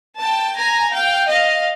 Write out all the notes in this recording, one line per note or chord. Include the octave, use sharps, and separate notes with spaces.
G5 A5
G#5 A#5
F5 G5
D#5 F5